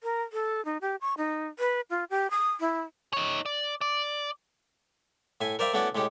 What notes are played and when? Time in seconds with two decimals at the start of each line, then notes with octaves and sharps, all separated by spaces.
0.03 A#4
0.33 A4
0.65 D#4
0.81 G4
1.01 C#6
1.17 D#4
1.59 B4
1.90 F4
2.10 G4
2.31 D#6
2.60 E4
3.13 D#4 C#5
3.46 D5
3.81 D5
5.41 A2 E5 G#5
5.59 A#4 C5 D5 E5 F5 G5
5.73 A3 B3 C#4 E4 F#4 D5
5.95 A2 G#3 C#4 G4